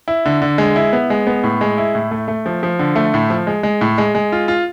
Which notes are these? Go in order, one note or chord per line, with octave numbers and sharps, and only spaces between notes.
E4
D3
D3
G#3
E4
B3
G#3
B3
A2
G#3
E4
A2
A3
A3
F3
F3
D3
A3
A2
F3
G#3
G#3
A2
G#3
G#3
F4
F4